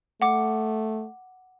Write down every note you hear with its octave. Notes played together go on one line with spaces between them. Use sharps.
A3 F#5 D6